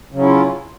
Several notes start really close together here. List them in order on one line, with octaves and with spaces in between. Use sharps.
C#3 F#3 C#4 E4 F4